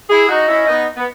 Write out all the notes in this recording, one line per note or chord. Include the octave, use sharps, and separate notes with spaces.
E4 G#4
D#4 F#4 D#5
C#4 E4
B3 D#4
B3